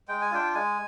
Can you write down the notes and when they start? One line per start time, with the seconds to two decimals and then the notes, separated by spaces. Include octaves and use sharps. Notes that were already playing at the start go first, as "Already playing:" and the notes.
0.08 G#3 G5
0.22 G#5
0.31 D4 F4 G5
0.55 G#3 G#5